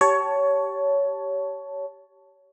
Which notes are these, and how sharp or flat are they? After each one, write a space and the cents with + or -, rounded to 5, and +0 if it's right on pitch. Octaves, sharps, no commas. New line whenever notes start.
G4 -15 C#5 +15 A5 +0